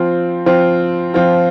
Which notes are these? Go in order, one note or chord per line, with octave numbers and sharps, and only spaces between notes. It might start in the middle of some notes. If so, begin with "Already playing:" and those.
Already playing: F3 C4 F4
F3 C4 F4
F3 C4 F4